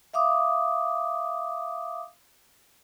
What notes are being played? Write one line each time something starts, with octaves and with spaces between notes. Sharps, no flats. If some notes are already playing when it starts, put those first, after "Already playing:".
E5 F5 D6 D#6